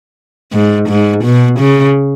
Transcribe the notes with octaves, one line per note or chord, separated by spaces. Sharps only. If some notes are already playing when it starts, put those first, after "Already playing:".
G#2
G#2
B2
C#3